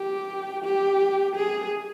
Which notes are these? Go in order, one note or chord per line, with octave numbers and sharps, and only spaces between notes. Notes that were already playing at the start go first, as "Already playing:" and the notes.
Already playing: G4
G4
G#4